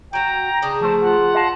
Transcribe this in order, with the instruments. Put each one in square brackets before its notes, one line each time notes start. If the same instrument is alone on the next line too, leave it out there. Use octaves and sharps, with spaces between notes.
[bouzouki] F#3 F#4 [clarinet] G5 [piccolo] A#5
[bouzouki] C#3 D4 G#4 [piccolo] D#6
[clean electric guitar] F3 A3 C5 [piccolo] A5
[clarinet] F4 [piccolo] F#5
[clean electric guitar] D#5 F5 A5